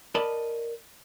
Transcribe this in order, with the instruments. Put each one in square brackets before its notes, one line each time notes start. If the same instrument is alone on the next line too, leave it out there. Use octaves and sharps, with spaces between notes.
[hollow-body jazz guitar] A#4 D5 D#5 A5 B5